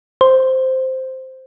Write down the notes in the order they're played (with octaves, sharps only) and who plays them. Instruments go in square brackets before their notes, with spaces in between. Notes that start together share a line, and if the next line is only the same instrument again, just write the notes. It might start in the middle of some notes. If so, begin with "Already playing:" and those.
[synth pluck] C5